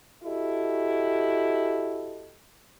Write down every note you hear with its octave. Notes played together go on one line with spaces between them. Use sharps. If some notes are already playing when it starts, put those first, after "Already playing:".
E4 F#4 G4 A4 D#5